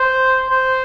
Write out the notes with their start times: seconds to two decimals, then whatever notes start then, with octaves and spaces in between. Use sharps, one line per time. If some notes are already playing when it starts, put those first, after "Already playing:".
Already playing: C5
0.50 C5